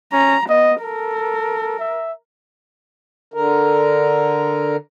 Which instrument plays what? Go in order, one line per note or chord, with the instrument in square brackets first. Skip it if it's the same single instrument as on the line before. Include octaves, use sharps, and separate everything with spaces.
[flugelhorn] C#4 [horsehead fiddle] A#5
[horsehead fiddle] B3 [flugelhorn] D#5
[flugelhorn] A4 [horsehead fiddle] A#4
[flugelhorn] E5
[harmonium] D3 A#4